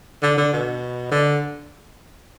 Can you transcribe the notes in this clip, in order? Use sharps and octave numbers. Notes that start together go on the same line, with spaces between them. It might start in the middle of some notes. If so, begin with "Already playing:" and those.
D3
D3
B2
D3